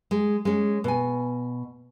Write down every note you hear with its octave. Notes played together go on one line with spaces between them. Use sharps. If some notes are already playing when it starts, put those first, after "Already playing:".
G#3
G#3 C#4
B2 G#5